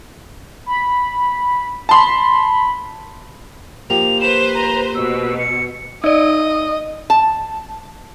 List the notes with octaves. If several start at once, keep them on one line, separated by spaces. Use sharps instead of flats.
B5
A5 B5 C6
F3 A#3 G4 F7
B4 C5 E7
A#5
B2 E6
C#7
D#4 D5 D#5
A5